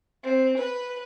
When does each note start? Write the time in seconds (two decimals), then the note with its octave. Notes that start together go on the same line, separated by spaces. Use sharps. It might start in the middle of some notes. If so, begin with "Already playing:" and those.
0.24 C4
0.58 B4